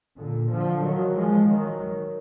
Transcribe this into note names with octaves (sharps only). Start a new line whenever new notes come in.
A#2 D3
D3 F3
D#3 F#3
F3 G#3
D#3 F#3